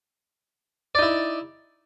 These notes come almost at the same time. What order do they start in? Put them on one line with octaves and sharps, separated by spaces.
D5 D#4 E4